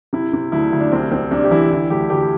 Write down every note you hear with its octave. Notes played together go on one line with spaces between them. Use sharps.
C3 E4
C3
D2 E4
D2
D4
C2 C4
C2 C4
C2 D4
G4
E3 E4
D3 E4
D2 G4
D2 G4